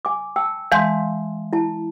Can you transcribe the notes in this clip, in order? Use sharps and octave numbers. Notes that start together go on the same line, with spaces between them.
G#5 D6
G5 A5 E6
E3 G#3 F5 A5 C6 G6
E4 A5